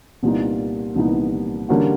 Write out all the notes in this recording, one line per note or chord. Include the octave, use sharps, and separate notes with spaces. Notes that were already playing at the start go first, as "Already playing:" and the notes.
C2 A#2 G3 B3 D#4
C2 A#2 G3 B3 D#4
D3 G3 A#3 C#4 F#4